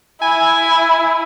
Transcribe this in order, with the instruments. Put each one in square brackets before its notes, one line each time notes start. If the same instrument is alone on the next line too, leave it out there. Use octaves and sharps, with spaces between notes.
[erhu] E4 [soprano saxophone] G#5